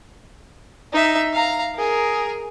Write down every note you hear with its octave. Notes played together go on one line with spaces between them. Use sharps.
D#4 E5
F5 A#5
G#4 A#4